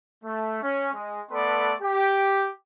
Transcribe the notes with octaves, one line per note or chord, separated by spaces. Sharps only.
A3
C#4
G#3
A3 B3 A4 B4 D5 C6
G4